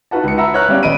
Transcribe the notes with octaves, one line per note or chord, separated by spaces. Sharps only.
D#4 F4 F#4 B4 F#5 A5
C#2 C#7
E5 F#5 A#5 B5 E6
B4 C#5 F#5 A#5 F6 F#6
G3 B3 C#4 D5 F5
D#1 D#5 B5 D7 D#7